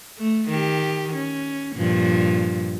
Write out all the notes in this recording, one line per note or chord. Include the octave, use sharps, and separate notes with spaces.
A3
D#3 G4
C#4
G2 A#2 F3